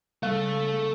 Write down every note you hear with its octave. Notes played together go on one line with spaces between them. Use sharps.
C#3 G3 A3 A4 F5